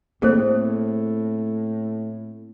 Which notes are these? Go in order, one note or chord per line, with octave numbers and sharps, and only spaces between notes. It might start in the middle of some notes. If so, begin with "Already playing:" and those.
A2 A#3 C4 G#4 A4 C5